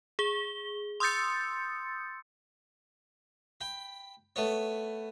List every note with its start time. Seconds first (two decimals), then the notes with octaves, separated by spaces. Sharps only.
0.19 G#4 G7
1.00 C6 D#6 E6 G6 A6 C#7
3.61 G5 B5
4.36 A3 B3 C#5